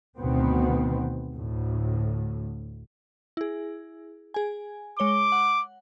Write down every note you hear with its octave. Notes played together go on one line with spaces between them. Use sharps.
D2 B2 D#3 B3 C4
D2 A2
E4 G#4
G#4 G#5
G#3 C#5 D6 G7
F#5